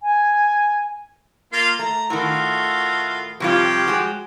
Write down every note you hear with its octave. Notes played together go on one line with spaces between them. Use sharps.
G#5
A#3 F4 F5
A3 A#5
A2 D#3 A3 F4 F#4
C3 F3 G3 F4 G4 C#5
G#3 F#4